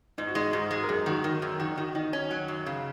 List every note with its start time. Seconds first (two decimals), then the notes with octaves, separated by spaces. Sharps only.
0.18 G#2 D#4
0.27 F#4
0.35 G#3 D#4
0.53 G#2 F#4
0.71 G#3
0.83 A#4
0.89 F#2 G#4
1.06 D#3 F#4
1.24 D#3 A#4
1.42 F#2 A#4
1.59 D#3 F#4
1.68 D#4
1.77 D#3 F#4
1.95 D#3 D#4
2.13 C#4
2.31 F#3
2.48 F#2
2.66 C#3